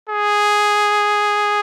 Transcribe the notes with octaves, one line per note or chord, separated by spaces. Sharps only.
G#4